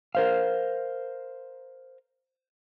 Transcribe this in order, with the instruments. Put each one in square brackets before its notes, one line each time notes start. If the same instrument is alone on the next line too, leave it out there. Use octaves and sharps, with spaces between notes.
[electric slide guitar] A#4 C5 F5